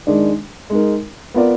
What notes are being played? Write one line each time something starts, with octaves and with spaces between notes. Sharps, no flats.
D#3 G#3 D4
G#3 D#4 A#4
B3 F4 A#4 D5